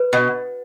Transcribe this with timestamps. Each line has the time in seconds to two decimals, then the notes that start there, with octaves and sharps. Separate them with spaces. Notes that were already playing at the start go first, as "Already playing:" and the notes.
Already playing: B4
0.13 B2